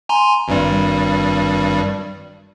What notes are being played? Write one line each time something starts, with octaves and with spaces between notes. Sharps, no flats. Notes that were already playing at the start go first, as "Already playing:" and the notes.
G#5 A#5 C6
G#1 G2 G3